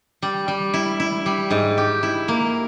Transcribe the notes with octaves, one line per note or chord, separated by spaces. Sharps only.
G3
G3
E4
E4
G3
G#2
G4
E4
A#3